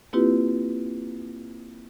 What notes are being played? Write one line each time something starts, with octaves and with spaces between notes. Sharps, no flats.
A#3 C4 E4 F4 G4 B4